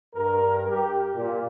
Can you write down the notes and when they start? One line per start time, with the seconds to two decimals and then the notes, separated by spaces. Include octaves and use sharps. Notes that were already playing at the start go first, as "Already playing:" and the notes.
0.14 G2 A#4
0.68 G4
1.15 A#2